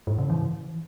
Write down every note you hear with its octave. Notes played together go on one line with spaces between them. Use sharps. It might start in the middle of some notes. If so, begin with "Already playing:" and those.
G#2
C#3
E3